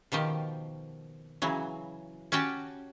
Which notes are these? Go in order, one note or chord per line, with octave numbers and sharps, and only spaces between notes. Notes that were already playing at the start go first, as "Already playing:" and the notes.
B2 D#3 F3 G4
C#3 E3 F#3
C#4 F#4 G4 G5 A5